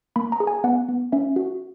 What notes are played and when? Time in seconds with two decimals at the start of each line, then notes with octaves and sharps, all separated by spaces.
0.16 A#3 B5
0.32 A#5
0.40 G#4
0.47 G#5
0.64 B3 F#5
0.89 B3
1.12 C#4 E5
1.36 F#4